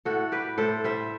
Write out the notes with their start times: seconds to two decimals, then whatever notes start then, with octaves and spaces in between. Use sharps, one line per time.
0.05 A2 F#4 A4
0.32 G3 G4 B4
0.58 A2 A4 C5
0.84 G3 C5 E5